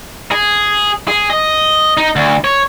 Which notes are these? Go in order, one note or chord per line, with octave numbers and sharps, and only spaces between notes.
G#4
G#4
D#5
D#4
D2
C#5